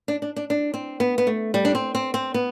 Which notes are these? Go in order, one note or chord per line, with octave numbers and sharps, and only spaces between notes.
D4
D4
D4
D4
C4
B3
B3
A3
G3
D4
C4
C4
C4
B3